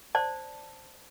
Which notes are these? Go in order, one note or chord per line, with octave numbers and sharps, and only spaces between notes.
C5 D5 A5